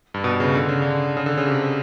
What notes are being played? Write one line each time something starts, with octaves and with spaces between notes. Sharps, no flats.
G2
B2
C#3
D3
C#3
D3
C#3
D3
C#3
C3